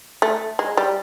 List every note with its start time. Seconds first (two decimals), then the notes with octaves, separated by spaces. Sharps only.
0.22 A3
0.59 G#3
0.77 G3